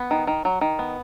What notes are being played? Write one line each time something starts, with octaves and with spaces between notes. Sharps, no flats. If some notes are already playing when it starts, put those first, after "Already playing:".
Already playing: B3 B5
D#3
D#3
F#3
D#3
B3